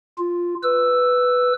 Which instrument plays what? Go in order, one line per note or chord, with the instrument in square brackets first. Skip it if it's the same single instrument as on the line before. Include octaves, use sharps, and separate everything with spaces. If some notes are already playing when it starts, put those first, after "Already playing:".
[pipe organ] F4
B4 E6